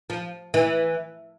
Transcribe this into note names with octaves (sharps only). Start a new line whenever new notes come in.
F3
E3